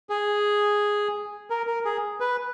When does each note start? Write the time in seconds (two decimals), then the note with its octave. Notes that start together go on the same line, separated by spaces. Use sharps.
0.10 G#4
1.50 A#4
1.67 A#4
1.85 G#4
2.20 B4